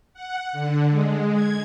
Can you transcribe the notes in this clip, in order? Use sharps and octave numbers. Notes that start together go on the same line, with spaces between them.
F#5
D3
G#3
G#6